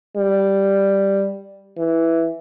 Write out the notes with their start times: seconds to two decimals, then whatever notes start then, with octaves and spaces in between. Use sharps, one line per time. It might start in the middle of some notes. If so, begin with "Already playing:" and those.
0.16 G3
1.77 E3